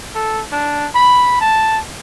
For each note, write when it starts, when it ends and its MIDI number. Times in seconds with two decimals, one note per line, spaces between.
0.15 0.42 69
0.52 0.87 62
0.95 1.39 83
1.41 1.79 81